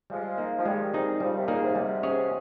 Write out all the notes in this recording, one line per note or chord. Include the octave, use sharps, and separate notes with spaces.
F3 G3 G#3
A#3 D#4
F3
D#3 G3 G#3
C4 D#4 G#4
C#3 F3 G3
C3 D#3
A#2 C#3 A#3 D#4 G#4
G#2 C3
G3
C#4 G#4 C#5